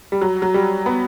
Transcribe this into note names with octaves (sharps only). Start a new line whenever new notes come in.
G3
F#3
F#3
G3
B3